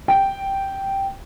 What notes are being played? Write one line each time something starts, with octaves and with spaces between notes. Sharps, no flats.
G5